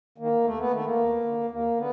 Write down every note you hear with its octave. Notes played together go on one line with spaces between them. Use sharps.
D#3 A#3
D#2 A3
B3
D#3 A3
A#3
D#2
D3
D#2 A#3
D3 B3